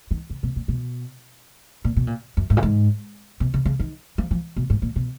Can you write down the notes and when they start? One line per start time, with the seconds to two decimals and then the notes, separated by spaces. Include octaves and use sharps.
0.11 D#3
0.30 C#3
0.43 B2
0.56 A#2
0.68 B2
1.85 A#2
1.97 B2
2.07 A#2
2.37 F#2
2.50 G#2
2.57 A#2
2.63 G#2
3.40 B2
3.54 C#3
3.65 C#3
3.80 D#3
4.18 F3
4.31 F3
4.57 B2
4.70 G#2
4.82 A#2
4.96 B2